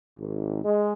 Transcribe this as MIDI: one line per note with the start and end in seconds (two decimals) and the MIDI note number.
0.18 0.63 32
0.64 0.93 56